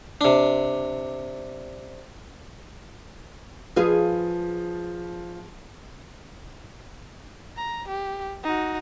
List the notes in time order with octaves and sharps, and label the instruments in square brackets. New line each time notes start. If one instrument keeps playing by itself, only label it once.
[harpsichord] C3 D4
[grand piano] F3 [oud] G#4 B4 F5
[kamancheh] A#5
G4
D#4 F#4